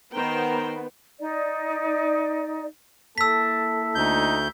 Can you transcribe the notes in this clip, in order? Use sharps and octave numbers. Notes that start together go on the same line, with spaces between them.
D#3 B3 A#4 C5 G5
D#4 D5
A#3 E4 A4 A5 E6 B6
D2 D#4 G6